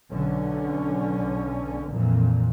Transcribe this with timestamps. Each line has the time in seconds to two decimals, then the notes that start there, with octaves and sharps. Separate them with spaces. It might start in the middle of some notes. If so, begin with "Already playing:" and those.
0.12 B1 D3 C#4
1.91 F2 A#2 E3